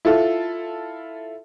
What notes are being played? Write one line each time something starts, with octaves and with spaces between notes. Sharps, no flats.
E4 F4 A4